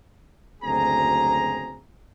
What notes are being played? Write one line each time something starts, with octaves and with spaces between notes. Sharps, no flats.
F#1 D2 C4 G#4 A#5